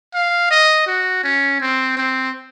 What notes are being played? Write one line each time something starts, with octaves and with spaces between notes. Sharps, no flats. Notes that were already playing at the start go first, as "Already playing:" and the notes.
F5
D#5
F#4
C#4
C4
C4